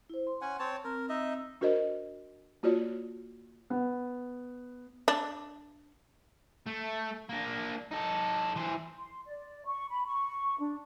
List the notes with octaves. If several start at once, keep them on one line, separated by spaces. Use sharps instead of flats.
E4 C5
C6
C#4 F#5 G#5
C4 C#5 A5
C4 A#4
D#4 D#5 E5
D4 F#4 A#4 C5 D#5
A#3 F4 F#4 C#5 D5
B3
D4
A3
A#3 D4
D#4 A4
E3 C5
C6
D5
C#6
B5
C#6
D4